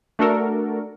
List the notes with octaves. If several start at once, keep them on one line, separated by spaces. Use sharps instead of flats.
A3 D4 F#4 A4 A#4